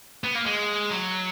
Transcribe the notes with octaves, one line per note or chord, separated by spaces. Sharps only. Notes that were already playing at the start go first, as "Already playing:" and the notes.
B3
A#3
G#3
F#3